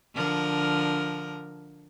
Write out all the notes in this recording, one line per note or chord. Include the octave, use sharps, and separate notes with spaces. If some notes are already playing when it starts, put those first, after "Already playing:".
D3 F3 A#4